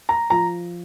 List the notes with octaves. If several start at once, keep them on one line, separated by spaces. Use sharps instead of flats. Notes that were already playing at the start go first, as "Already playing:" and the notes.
A#5
F3 A#5